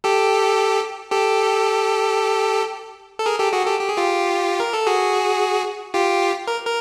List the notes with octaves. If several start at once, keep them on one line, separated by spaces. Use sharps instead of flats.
G4 A4
G4 A4
A4
G#4 A#4
G4 A4
F#4 G#4
G4 A4
G4
G#4
F4 G4
A#4
A4
F#4 G#4
F4 G4
A#4
A#4